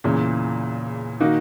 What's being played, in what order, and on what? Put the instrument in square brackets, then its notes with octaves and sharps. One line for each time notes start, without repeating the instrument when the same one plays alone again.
[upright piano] E2 C#3 E3 [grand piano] A#2
[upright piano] D#3 A#3 D#4 F#4